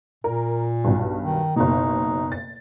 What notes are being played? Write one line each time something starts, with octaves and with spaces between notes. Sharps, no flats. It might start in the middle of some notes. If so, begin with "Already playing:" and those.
A#2 A#4
B1 G2
D#3
F#1 B2 D#4
A6